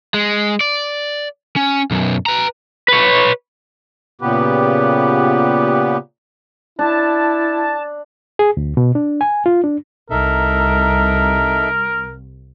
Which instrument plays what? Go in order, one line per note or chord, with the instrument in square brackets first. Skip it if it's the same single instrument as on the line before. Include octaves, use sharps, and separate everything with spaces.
[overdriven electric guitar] G#3
D5
C#4
B1 F#2
B4 A#5
B4 C#5
[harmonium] A#2 C#3 B3 G4 B4
[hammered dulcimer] D4 [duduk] E4 [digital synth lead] A5
[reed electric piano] G#4
D2
B2
D4
G#5
F4
D4
[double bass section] C2 [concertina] D#4 A4 E5 [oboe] A#4